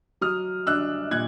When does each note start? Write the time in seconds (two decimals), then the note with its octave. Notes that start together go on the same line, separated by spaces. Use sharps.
0.21 F#3 D#6 F6
0.67 D4 E6 F#6
1.11 A#2 F#6 G#6